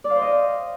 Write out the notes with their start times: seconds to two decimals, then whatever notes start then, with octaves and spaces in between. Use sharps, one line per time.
0.04 D5
0.10 F5
0.16 C5
0.21 D#5